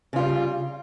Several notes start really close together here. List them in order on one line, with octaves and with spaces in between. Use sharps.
C#3 F4 G3